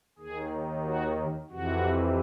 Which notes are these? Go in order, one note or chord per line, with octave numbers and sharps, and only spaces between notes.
D#2 D#3 G#4
F#4
F2 C3 E3 F#4